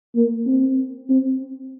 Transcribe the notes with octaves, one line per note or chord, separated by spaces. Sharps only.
A#3
C4
C4